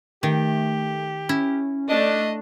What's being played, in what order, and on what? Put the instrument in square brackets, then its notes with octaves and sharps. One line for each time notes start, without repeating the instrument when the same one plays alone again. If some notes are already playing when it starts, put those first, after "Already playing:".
[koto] D#3 [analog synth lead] A3 [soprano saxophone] G4
[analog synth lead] C#4 [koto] E4
[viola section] A3 D4 [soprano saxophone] D#5